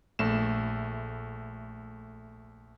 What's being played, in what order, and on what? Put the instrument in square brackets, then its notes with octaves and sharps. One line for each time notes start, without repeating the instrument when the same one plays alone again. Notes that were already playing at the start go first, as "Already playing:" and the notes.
[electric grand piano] A#1 A3 E7